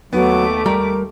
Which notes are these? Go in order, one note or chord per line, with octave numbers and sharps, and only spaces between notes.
D#2 F#3 A3 B3 D6
G3 A#4 A#5